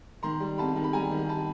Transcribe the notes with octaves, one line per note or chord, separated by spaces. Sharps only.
D#3 A#5 C6
G3
C2 A5 B5
D#3
B5
G3 G#5 A#5
D#3
A5 B5